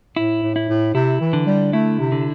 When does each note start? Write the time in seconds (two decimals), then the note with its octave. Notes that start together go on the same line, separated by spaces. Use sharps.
0.16 A2 E4
0.42 A2
0.56 E4
0.69 A2
0.94 C3 E4
1.20 E3
1.33 D3
1.46 G3
1.73 A3 E4
1.99 C3
2.12 D3